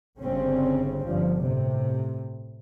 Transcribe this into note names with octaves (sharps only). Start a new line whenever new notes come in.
G1 G2 C#3 C4 C#4
G1 G2 F3
A2 C3